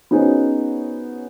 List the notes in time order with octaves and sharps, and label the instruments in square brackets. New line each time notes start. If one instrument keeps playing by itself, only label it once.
[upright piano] B3 C#4 D#4 F#4 G#4 C5